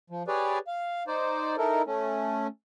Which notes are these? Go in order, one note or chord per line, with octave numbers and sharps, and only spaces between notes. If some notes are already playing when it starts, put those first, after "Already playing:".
F3
G4 G#4 B4 C#5 D5
F5
D#4 C5 D5
D#4 E4 A4 A#4
A3 C#4